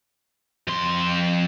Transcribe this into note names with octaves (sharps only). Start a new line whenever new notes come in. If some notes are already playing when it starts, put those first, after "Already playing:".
F2 C6